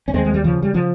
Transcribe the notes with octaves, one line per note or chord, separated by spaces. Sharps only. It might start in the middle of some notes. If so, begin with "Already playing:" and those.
C#4
D#2 G#3 C4
G#3
G3
C#3 F3
G3
C#3 F3